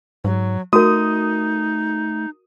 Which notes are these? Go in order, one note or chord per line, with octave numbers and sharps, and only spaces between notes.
G#2 F#3
A3 D#4 F#4 A#4 D#6